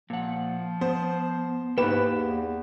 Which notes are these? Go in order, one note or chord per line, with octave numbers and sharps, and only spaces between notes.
A#2 F3 F#5
B3 C5
G#2 A#3 G4 B4 G5 E7
E2